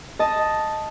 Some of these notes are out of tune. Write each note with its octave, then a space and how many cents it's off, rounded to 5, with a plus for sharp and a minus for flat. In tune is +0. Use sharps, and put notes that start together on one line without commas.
D#5 +0 A5 +0